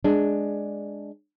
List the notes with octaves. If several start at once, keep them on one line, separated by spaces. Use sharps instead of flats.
G#3 D4